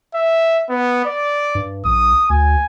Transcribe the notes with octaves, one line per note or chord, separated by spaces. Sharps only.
E5
B3
D5
G2
A#1 D#6
D2 G#5